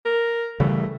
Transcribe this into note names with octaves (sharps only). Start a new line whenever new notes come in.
A#4
C#3 E3 G3 A3